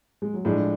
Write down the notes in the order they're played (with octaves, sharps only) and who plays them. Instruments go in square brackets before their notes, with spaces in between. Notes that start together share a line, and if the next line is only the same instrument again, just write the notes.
[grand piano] G#3
F#3
[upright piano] A2 G#3 D4 [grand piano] F3